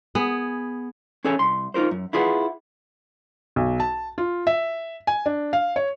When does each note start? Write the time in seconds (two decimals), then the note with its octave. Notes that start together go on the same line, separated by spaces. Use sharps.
0.15 B3 G#4
1.24 C#4 G#4 A4 C#5 G#5
1.39 C2 C6
1.74 D#4 F4 A#4 C5
1.91 F#2
2.13 E4 F4 G#4 B4 E5 F#5
3.56 B1
3.80 A5
4.18 F4
4.47 E5
5.07 G#5
5.26 D4
5.53 F5
5.76 C#5